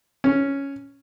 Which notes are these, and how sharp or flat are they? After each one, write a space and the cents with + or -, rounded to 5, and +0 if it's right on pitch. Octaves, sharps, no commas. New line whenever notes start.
C#4 +0